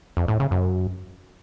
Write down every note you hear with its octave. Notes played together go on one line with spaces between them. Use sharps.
F2
A2
C#3
F#2